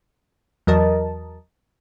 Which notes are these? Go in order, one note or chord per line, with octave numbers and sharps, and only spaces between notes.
E2 F#3 A#4 D#5 A5